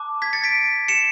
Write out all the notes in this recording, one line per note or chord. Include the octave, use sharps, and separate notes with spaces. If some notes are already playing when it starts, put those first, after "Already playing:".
Already playing: A5 D6 F#6
G#6 B6
A6 C#7
B6 D7
C#7 E7